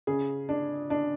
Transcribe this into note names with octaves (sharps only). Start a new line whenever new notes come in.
C#3 G#4
D4
D4